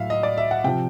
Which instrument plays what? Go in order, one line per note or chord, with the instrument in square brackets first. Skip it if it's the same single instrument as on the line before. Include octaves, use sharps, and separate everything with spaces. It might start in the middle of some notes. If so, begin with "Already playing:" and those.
Already playing: [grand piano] A2 F#3 E5 F5
D#5
D5
E5
F#5
C3 F3 G5